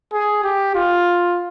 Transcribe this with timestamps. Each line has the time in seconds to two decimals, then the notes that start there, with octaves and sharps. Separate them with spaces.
0.13 G#4
0.44 G4
0.75 F4